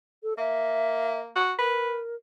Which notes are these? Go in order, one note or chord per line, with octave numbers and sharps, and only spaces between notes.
A4
A#3 E5
F#4
A#4 B4